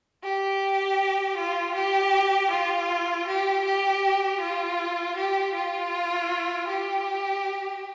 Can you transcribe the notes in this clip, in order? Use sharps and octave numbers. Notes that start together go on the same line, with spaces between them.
G4
F4
G4
F4
G4
G4
F4
G4
F4
G4